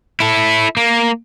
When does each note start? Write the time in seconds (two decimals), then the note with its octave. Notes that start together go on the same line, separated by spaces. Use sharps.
0.20 E4 A4
0.77 A#3